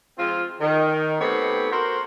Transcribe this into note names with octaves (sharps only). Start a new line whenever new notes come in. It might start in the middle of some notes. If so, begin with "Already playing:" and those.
F3 G#3 C4 F4
D#3
A3 B3 C4 D#4 G4 C#5
F#4 A#4 C5